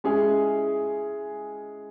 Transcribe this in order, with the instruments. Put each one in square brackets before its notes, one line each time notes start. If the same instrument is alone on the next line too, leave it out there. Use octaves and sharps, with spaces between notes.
[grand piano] G#3 C#4 E4 G#4